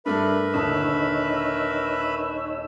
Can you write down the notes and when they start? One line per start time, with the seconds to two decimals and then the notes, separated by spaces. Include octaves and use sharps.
0.06 G2 A3 D4 A#4 B4 E5 B5
0.54 D#1 D3 D#4 C#5 D#6 E6